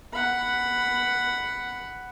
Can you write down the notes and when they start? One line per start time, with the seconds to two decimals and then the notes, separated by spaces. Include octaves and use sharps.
0.13 F#5 B5